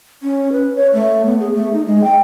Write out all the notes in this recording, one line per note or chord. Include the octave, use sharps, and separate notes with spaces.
C#4
B4
C#5
A3
B3
G#4
A3
D#4
G#3
G5